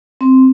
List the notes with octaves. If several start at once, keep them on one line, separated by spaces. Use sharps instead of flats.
C4